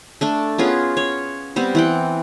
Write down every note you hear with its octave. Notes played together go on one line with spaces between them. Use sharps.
A3 D4 A4
B3 C#4 F4 G#4
C#5
G3 B3 C4
E3 F#5 G5